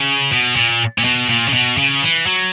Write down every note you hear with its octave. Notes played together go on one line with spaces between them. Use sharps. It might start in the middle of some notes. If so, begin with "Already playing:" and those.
Already playing: C#3
B2
A#2
A#2
B2
A#2
C#3
B2
C#3
E3
F#3